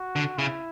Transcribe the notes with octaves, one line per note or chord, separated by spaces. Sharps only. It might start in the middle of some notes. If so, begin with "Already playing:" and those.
Already playing: F#4
D3
C#3 E4